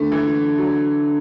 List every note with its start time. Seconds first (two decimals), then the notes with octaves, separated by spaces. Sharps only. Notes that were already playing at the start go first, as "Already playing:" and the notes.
Already playing: D3 A3
0.12 E3
0.58 F#3